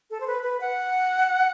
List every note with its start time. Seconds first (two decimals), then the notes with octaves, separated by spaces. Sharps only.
0.11 A4
0.20 C5
0.27 B4
0.43 B4
0.61 F#5